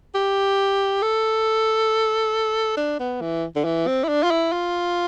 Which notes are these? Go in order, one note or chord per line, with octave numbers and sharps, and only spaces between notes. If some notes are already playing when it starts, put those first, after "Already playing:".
G4
A4
D4
B3
E3
D3
E3
C4
E4
D4
F4
E4
F4